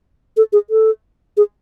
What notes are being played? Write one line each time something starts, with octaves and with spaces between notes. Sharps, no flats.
A4
G#4
A4
G#4